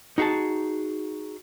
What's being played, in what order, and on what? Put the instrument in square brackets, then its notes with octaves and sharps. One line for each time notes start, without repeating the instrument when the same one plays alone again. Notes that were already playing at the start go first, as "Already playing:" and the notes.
[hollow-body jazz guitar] D#4 F#4 G#4 F#5 A5